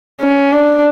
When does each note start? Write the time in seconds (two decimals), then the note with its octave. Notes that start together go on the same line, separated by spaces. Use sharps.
0.20 C#4
0.53 D4